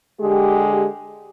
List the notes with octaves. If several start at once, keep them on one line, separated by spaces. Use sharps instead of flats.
D3 G#3 G4